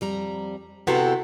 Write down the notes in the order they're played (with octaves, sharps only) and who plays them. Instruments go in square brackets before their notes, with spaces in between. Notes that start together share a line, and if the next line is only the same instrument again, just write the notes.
[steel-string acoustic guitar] F2 G3 A#5
[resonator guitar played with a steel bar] C3 B3 [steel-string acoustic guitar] E4 F#4 A4